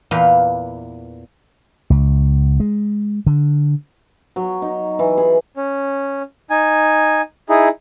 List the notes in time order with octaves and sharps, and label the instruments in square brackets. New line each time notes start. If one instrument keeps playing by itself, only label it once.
[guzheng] E2 A#2 B4 F5 G5 A#5
[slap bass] C#2
G#3
D3
[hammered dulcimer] F#3
D#4
E3
G#4
[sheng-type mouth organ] C#4
D#4 G#5
D#4 E4 G#4